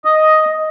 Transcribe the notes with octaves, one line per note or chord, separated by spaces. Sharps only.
D#5